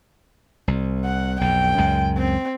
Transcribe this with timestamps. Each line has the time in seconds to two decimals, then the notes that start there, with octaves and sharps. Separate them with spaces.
0.68 C2
1.05 F#5
1.41 B1 F2 G5
1.77 C#2 F#2 G#3
2.17 C4